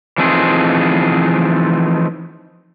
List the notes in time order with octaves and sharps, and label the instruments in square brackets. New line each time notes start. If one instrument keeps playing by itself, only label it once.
[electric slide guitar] E3 F3 A3 C4 D#4 G#4